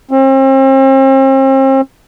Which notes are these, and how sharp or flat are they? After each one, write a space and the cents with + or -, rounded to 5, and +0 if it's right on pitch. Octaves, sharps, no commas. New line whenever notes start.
C4 +40